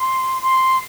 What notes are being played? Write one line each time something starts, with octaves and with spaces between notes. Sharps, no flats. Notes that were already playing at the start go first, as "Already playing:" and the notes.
Already playing: C6
C6